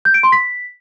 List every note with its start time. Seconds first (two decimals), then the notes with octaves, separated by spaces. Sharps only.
0.05 G6
0.14 D7
0.23 C6
0.32 B6